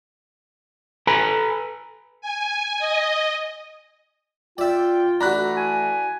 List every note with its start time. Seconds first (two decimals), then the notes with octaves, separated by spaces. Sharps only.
1.07 A4 B4 G#5 A#5 B5
2.21 G#5
2.79 D#5
4.58 F4 D5 E5 G5
5.21 E3 A3 D4 F#4 A#5 B5 F#6
5.57 G#5